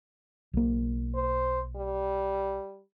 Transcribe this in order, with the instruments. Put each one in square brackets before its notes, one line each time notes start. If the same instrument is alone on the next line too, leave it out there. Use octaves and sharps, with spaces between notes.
[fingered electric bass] B1 A#3
[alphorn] C5
G3